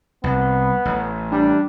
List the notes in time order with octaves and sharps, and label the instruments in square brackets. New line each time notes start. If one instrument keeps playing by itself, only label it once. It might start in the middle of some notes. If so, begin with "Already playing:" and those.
[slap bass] C2 [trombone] B3
[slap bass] A1
[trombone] G3 [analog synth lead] D4